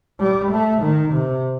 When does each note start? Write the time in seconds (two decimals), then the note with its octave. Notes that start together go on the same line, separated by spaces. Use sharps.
0.20 G3
0.52 A3
0.82 D#3
1.13 C3